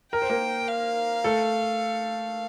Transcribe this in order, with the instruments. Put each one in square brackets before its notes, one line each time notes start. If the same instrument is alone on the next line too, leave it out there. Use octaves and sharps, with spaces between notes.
[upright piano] A#4 [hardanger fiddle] G5
[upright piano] C5
A#3 A#4
[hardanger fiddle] F5
[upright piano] A3 A4